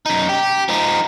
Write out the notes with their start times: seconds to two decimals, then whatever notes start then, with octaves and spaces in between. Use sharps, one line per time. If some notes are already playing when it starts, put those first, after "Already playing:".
0.06 F#2 D#4
0.29 G4
0.69 F3 D#4